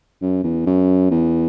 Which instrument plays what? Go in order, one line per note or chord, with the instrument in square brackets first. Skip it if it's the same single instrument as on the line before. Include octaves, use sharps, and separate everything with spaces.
[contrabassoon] F#2
E2
F#2
E2